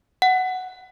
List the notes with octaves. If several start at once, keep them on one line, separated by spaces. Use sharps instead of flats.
F#5